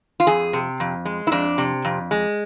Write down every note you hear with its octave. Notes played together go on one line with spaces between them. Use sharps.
F4
F2 G#4
C3
F2
G#3
E4
F2 D4
C3
F2
G#3